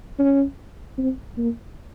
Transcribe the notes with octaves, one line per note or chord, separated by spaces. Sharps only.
C#4
C4
A#3